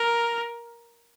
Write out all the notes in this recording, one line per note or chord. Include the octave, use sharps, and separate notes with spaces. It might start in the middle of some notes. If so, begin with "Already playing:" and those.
Already playing: A#4